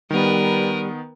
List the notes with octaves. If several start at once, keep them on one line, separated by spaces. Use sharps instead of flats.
D#3 G3 B3 A#4 B4